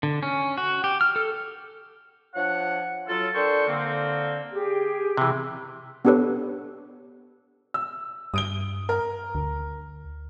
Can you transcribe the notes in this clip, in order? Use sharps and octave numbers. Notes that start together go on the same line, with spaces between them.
D3
C#4
F#4
G4
F6
A4
F3 D4 C#5 F#5
F#3 F4 A4
D4 A4 A#4 C5 G5 C#6
D3 A#3 C4
G4 G#4
C3 E3
B3 D4 G4 A4 B4 C#5
E6
G2 D#6 D7 G7
A#4
D2